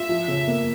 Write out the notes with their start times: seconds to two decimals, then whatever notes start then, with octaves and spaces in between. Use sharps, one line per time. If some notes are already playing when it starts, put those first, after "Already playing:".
Already playing: F4 E5
0.09 F3
0.28 C#3
0.48 A#3